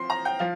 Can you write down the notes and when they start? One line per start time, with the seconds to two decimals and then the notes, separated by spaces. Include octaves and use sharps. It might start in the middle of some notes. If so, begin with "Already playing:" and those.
Already playing: F3 C4 C6
0.10 A#5
0.25 G5
0.39 F3 F5